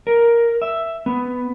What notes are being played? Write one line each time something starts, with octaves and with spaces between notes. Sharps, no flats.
A#4
E5
B3